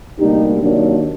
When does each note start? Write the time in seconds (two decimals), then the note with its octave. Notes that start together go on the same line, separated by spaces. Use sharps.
0.19 D2 C3 G3 A#3 D4 D#4 G4
0.61 C3 D#3 F#3 A#3 D4